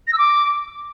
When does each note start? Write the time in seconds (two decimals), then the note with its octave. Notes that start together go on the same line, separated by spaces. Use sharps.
0.07 A#6
0.13 E6
0.18 D6